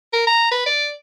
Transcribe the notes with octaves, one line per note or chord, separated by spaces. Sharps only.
A#4
A#5
B4
D5